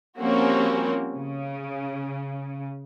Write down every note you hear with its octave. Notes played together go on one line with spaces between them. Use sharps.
F3 G3 A#3 C4 C#4 F#4
C#3